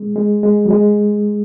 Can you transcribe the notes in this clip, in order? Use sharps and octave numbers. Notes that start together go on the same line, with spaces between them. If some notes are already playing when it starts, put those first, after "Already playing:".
Already playing: G#3
G#3
G#3
F#3
G#3